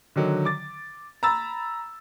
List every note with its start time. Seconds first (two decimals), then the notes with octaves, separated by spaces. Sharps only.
0.16 D3 D#3 F#3
0.45 D6 A6
1.23 A#5 B5 E6 A6